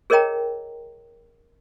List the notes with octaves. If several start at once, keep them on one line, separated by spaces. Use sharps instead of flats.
G#4 A#4 C#5 D#5 G5 A#5